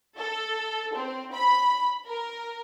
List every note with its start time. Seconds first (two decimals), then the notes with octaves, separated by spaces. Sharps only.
0.18 A4
0.94 C4
1.33 B5
2.06 A#4